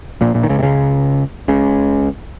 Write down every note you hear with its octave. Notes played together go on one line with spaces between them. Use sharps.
A#1 A#2
A#1 A#2
D#3
C#2 C#3
C3
C#2 C#3
C#2 C#3